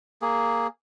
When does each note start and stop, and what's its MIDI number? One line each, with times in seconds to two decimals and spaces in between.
0.22 0.67 58
0.22 0.67 68